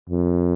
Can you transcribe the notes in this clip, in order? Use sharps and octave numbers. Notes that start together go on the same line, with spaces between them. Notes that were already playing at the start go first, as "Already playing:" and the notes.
F2